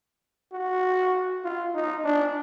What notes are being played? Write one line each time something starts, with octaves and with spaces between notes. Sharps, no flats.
F#4
F4
D#4
D4